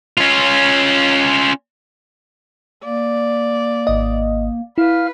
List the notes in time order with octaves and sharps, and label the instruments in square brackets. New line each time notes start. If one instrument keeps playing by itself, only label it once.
[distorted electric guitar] C#4 F4
[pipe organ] A#3 [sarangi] D5
[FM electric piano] G#1 D#5
[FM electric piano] E4 [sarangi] B4 [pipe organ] F5 F6